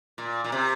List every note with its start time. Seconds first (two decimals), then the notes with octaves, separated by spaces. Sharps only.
0.18 A#2
0.44 A#2
0.52 C3